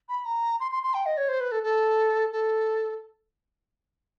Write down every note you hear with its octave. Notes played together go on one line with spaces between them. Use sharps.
B5
A#5
C6
C6
C6
G5
D#5
C#5
C5
B4
A4
A4
A4